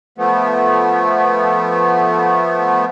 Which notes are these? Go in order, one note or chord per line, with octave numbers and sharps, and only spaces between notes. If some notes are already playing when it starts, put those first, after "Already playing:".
F3 A3 B3